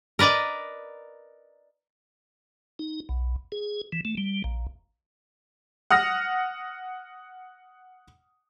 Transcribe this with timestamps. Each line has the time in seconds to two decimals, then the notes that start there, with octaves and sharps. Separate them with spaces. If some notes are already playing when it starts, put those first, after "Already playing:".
0.19 A#4 B4 D5 D#5 A#5
2.79 D#4
3.09 B1
3.52 G#4
3.92 E3
4.05 A3
4.17 G3
4.44 A#1
5.91 F#5 D#6 F6 A#6